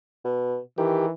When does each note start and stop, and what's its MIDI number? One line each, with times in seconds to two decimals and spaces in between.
0.24 0.58 47
0.78 1.07 51
0.78 1.13 52
0.78 1.06 67